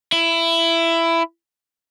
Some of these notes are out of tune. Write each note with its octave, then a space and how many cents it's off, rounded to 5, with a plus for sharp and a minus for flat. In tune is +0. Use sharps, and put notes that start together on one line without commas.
E4 +15